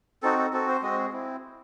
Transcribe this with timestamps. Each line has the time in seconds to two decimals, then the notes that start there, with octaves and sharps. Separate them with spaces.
0.23 C4 D#4 F#4 A4
0.38 A4
0.53 C4 F#4 A4
0.68 C5
0.82 G#3 C4 F#4 D#5
0.97 G#4
1.13 C4 E4